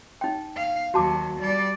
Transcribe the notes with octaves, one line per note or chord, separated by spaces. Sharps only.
D#4 G5
F5
D#2 F#3 F#4 A5 D6
G3 D5